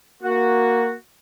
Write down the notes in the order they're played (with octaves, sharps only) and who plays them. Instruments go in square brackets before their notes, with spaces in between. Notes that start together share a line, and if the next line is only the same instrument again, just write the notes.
[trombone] A#3 [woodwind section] F#4